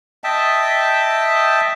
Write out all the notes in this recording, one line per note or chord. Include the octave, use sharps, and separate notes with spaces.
D#5 E5 G5 A5